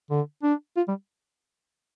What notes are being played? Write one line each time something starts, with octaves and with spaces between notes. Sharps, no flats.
D3
D4
F4
G3